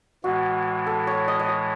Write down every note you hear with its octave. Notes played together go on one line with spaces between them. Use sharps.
A2 E3 G#3 F#4
A4
C#5
D#5
D#5
C#5